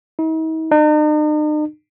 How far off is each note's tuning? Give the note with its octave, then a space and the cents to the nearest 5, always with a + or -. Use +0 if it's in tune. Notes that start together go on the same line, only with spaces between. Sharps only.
D#4 +45
D#4 -45